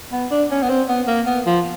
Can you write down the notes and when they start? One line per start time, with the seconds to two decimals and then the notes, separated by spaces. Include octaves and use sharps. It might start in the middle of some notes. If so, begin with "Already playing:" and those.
0.12 B3
0.31 D4
0.51 C#4
0.62 B3
0.69 C4
0.88 B3
1.07 A#3
1.27 B3
1.46 F3